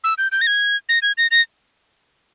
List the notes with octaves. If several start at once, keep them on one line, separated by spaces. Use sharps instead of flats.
E6
G6
G6
A#6
G#6
A#6
G#6
A#6
A#6